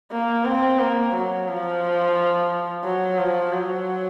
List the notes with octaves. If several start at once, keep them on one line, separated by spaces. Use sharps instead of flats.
A#3
C4
A#3
F#3
F3
F#3
F3
F#3